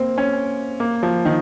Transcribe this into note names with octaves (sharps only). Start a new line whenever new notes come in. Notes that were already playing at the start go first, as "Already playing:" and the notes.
Already playing: A#3 C4
C#4
A#3
F3
D#3